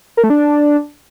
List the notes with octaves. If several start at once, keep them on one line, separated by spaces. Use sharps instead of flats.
A#4
A3
D4